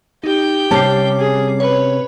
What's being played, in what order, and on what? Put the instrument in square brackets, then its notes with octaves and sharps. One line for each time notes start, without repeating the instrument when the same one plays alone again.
[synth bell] D#4 [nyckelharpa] G4 G5
[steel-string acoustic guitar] C3 C#4 A5 [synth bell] G3 D6 C7
[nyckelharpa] G#4
[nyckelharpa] B4 [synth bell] C#5